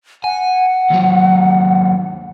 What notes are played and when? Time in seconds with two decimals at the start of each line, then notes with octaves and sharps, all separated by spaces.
0.24 F#5 G#5
0.90 D#2 F#3